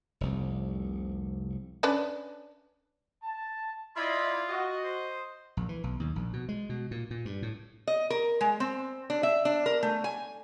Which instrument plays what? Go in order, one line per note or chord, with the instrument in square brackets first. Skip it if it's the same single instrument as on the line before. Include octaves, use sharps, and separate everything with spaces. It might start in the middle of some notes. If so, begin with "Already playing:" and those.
[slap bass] F1 C2
[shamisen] C#4 D4 B4
[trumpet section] A5
[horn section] E4 D5 [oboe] F4 [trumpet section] D#5 B5 C6
[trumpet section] F#4 [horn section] D#5
[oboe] C5
[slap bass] A#1
E3
B1
D#2
A#1
B2
G#3
B2
A#2
A#2
G2
A2
[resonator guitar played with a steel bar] D#5
A#4
G#3
C4
D4
E5
D4
A#4
A3
G#5